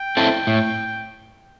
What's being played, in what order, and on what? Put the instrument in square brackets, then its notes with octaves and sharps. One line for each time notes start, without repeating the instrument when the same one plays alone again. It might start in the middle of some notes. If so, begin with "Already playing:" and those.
Already playing: [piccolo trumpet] G5
[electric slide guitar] C4 E4 A4
A2